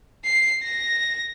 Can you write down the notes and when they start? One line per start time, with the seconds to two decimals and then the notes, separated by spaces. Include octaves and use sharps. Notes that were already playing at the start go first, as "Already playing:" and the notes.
0.25 C7
0.64 A#6